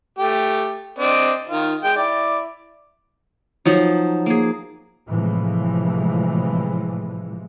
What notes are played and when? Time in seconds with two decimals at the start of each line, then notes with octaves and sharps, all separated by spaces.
0.18 A3 G4
0.99 C4 D4 D#5
1.49 D#3 F4
1.84 G#3 G5
1.96 E4 D5
3.65 F3 F#3 D#4
4.26 A#3 G#4
5.09 A2 C3 E3 F3 G#3